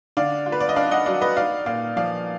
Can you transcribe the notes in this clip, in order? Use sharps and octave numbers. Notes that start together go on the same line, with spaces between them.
D3 D5 F5
F4
B4
D5
D#5
D4 D5 F5
D#5 F#5
F#3 D5 F5
B4 D#5
D#4 D5 F5
A#2 D5 F5
F3 D5 F5